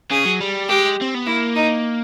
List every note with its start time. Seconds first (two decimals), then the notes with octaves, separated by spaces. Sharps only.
0.11 C#3 G#4
0.25 F#3
0.41 G3
0.69 G#3 G4
1.01 C4
1.14 B3
1.26 A#3 E4
1.55 D#4